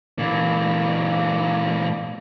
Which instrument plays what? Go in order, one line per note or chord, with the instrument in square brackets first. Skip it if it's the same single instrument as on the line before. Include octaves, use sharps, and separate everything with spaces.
[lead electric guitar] A#2 E3